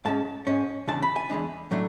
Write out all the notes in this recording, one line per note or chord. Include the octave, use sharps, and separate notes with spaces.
G#2 G#3 C#4 A5
G#2 G#3 C#4
E2 C#3 G#3 D4 A5
B5
G#5
E2 C#3 G#3 D4
A2 F#3 A3 D4